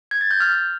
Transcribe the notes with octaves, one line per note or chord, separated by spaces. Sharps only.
G#6
A6
G6
F6